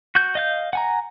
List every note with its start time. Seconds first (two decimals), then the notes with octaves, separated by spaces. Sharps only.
0.15 F#4 G6
0.35 D#5 F5 G6
0.73 F#5 G#5 A#5